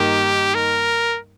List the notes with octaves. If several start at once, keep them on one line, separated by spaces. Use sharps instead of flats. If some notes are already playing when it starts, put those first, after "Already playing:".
Already playing: G2 D#3 A#3 D#4 G4
A#4